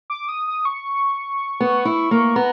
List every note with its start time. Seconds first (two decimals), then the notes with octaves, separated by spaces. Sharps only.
0.10 D6
0.29 D#6
0.47 D#6
0.65 C#6
1.60 B3
1.85 E4
2.11 A#3
2.36 B3 A#5